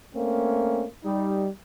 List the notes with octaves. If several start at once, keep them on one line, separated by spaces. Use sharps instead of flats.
A3 A#3 C4 C#4
G3 D#4